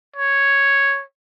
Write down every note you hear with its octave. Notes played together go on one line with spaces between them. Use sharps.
C#5